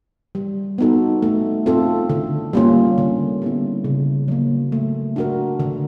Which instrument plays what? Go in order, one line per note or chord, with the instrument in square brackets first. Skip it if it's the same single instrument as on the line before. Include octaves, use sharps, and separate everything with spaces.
[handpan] G3
B3 D#4 F#4 A4
A3
C4 F4 A4
D3
G3 A#3 C#4 F4
D3
G3 B3 E4
C#3
F#3 A#3
A3
D4 F#4 A#4
D3